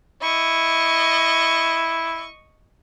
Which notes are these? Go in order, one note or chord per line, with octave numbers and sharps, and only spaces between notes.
E4 D#5 C#6